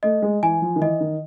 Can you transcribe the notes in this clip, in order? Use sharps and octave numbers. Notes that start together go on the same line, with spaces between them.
A3 D#5
G#3
E3 G#5
F3
D#3
E3 D#5
D#3